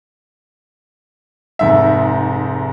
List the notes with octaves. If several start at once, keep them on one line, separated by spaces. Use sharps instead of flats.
F1 G#2 E5